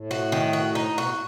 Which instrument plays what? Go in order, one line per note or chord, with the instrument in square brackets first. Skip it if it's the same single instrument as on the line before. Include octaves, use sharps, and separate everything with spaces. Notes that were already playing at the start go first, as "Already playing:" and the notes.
Already playing: [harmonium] A2
[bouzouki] F#4
D#3
F#4
D#4
[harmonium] B2 [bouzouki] F#4
[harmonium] A2